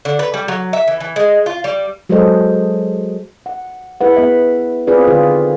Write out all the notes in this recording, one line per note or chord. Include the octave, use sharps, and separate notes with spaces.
D3
B4
G3
F#3
E5
E3
E3
G#3
F4
G3
F#3 G#3 G#4 A4 C5 D#5
F#5
E4 G#4 B4 F#5
B3 E5
C4 F4 G#4 B4 D5
D3 D#3 F4 G#4